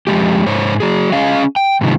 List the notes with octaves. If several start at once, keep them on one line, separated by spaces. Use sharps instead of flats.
F2 C#3 G#3 G4
G#2 C5 C#5
F#3 G#4
C#4 G#4 D#5 F5
G5
G#2 C3 D#3 F3